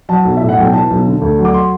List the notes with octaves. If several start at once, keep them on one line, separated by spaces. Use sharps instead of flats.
F#3 A5
B1
A2 E5
F#5
B1 G5
E3 A5
B1
D3
D2
F#3
D6
C6